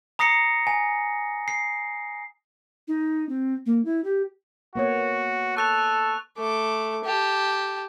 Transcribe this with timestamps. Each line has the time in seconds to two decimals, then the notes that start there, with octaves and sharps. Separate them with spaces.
0.19 A#5 D#6 A#6 C7 C#7
0.67 G#5
1.48 C7
2.88 D#4
3.29 C4
3.66 A#3
3.85 E4
4.04 G4
4.75 A#3 B3 F#4 C#5
5.57 A4 C#6 F#6 F7
6.37 A3 D6
7.04 G4 A5